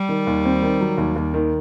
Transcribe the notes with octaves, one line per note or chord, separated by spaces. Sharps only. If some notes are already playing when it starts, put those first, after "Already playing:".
Already playing: G3
D#3
D#2
C4
D#3
F#3
D#2
D#2
D#3